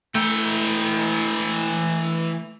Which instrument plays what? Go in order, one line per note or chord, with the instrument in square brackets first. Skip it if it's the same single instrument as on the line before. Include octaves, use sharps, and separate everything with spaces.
[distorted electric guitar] E3 G5 [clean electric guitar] A3